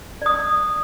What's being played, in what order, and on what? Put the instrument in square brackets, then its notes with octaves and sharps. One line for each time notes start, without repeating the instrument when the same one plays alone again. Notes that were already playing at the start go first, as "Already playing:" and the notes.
[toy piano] D5 D#6